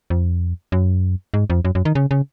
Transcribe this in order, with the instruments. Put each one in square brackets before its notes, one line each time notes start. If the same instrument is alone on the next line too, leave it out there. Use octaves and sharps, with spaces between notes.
[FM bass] F2
F#2
G#2
F2
F#2
F#2
D#3
C#3
C#3